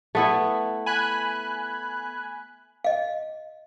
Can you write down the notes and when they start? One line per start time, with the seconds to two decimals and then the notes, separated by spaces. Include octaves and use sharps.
0.15 A3 B3 E4
0.86 G#5 B5 F#6
2.84 D#5 F5